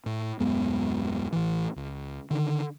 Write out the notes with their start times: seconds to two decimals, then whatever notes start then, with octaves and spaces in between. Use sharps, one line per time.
0.06 A2
0.39 D#1 F#2 G#3 B3
1.32 A1 E3
1.76 C#2
2.31 D3 D#3